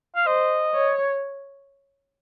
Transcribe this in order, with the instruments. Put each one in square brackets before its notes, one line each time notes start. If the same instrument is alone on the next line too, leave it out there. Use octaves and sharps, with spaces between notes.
[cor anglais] F5
[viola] C5 [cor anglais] D#5
[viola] C#5